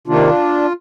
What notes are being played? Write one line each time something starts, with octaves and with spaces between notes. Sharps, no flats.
C3 D#3 A#3 D4 F4